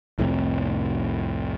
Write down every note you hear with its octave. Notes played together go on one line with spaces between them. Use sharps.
C2 F2 A2 C3